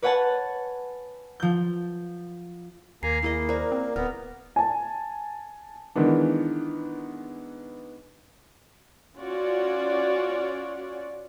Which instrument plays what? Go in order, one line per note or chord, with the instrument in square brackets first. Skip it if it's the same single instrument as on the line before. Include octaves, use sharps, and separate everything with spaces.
[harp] B4 C#5 F#5 G#5 A5
F3 G6
[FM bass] D#2 [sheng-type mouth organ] A#3 G#5 A#5 [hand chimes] C7
[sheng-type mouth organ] A#3 [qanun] E4 G#4 D#5
[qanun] A#4 [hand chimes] C5 D5
[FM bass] C4
[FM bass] D1 [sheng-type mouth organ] B3 [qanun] A#4 [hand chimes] F6
[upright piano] G#5 A5
[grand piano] D#3 E3 G#3 B3 D4
[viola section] C#4 F4 F#4 C#5 D5